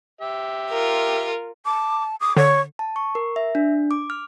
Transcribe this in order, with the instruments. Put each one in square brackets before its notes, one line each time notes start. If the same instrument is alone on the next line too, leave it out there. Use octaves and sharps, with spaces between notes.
[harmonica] G4 E5
[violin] F4 A#4
[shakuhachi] A5 [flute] D6
[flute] D6 [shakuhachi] D#6
[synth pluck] D3 [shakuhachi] C#5 [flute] C#6
[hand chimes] A5
C#6
A#4
E5
D4
D6
F6